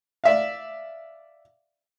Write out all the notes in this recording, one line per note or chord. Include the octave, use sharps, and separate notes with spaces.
D5 E5 F5